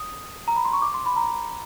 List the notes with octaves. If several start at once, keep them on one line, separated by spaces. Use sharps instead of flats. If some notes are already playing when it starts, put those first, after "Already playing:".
Already playing: D#6
A#5
B5
C6
C#6
D6
C6
B5
A#5